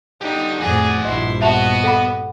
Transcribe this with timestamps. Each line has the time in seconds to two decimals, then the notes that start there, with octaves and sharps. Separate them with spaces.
0.21 D3 D#4 G4
0.60 F2 A2 F#4 G#4 D5
1.05 A#1 G2 F3 E4 D#5 C6
1.41 B3 F#4 D#5 E5 A5 F7
1.84 A4 F#5 B5